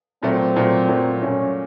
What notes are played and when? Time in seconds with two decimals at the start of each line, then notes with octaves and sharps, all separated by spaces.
0.23 A#2 F#3 A3 C4
0.56 A#2 F#3 A3
0.89 A#2 F#3 A3
1.22 A#2 F#3 A3 C#4